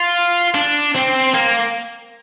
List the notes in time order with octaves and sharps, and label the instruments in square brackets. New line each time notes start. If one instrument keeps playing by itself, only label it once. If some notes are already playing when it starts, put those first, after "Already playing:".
Already playing: [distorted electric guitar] F4
D4
C4
A#3